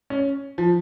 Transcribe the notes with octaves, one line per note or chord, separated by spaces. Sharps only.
C#4
F3